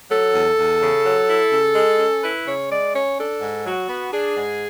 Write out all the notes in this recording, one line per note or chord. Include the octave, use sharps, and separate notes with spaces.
F#3 A4
E2
E2
C#3
F#3
E4
C#3
G#3
C#4
E4 B4
C#3 C#5
G#3 D5
C#4 C#5
D4 A4
G#2
F#3 F#4
B3
D4 G#4
G#2